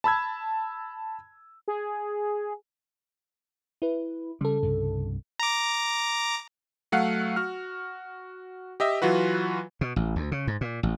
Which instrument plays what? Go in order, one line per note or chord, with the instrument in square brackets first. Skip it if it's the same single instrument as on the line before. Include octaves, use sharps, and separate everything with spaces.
[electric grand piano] A5 B5 E6 G#6
[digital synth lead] G#4
[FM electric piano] E4 B4
[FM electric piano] C#3 A4 [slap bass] G3
[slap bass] C2 G2
[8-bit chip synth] A#5 D6
[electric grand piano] F#3 A3 F5 F#5
F#4 F6
G4 D#5 E5
E3 F#3 F4 F#4 B4
[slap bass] B2
A1
D2
C#3
G#2
A#2
A1